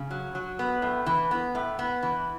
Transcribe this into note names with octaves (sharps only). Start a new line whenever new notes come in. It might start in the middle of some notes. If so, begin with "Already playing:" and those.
Already playing: C#3
F#3
F#3
B3
A2
E3
B3
A2
B3
E3